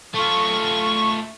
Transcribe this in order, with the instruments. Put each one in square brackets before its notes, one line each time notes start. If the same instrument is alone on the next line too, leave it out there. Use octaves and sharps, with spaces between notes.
[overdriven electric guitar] A3 F4 [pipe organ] C#6